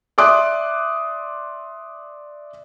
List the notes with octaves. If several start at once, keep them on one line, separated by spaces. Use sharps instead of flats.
D5 E5 C6 D6 D#6 F#6